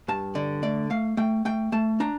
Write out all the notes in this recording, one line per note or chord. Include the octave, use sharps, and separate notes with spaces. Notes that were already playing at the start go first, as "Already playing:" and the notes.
G2 A5
D3 D5
A3 D5
A3 F5
A3 G5
A3 G5
A3 A5
D4 A#5